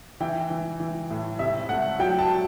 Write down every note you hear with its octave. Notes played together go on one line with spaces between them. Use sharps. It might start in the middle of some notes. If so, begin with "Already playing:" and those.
E3 G5
E3
E3
A2
C3 E5
A3 F#5
F#3 G5
A5